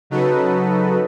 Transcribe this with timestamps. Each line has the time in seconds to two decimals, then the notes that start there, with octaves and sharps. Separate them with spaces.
0.10 C#3 F#3 D#4 F#4 A4 B4